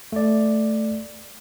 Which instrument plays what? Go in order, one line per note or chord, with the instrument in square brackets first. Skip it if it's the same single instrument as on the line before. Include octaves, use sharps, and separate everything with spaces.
[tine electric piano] A3 D5